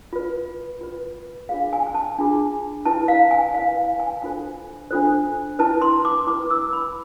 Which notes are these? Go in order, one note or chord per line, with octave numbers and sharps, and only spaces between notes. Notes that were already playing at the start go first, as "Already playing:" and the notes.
F4 B4
F4 B4
D4 F4 G#4 F5
G#5
G#5
A5
D4 F4 G#4
E4 B4 A5
F5
G#5
E4 B4 F5
F5
G#5
D4 F4 A4 C5 G#5
D4 F4 A4 C5
E4 B4 A5
C6
D6
E4 B4 D6
E6
B5